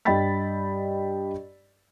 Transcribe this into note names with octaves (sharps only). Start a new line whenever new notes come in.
G2 D#5 G5 B5 A6 B6